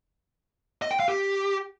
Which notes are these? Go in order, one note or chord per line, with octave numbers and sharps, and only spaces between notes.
D#5
G5
F5
G4